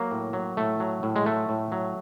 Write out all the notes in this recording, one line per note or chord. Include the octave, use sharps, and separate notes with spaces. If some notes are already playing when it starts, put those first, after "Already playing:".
Already playing: F#3 A#3
A2
F#3
A2 A3
F#3
A2
G#3
F#3 A3
A2
F#3